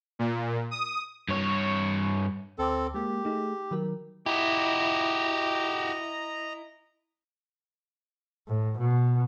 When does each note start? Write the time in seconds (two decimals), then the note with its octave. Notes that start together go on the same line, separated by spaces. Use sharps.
0.19 A#2
0.71 D#6
1.29 G2 C#5
2.59 D2 C4 A4 D6
2.94 G#3 A#3 G4
3.24 A3 D#4 G#4
3.71 D#3 F#3 A#4
4.26 E4 F#4 G4 D#5 A#5
8.48 A2
8.78 B2